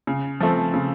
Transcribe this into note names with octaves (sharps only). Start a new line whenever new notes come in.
C#3
F3 A3 C4
C#3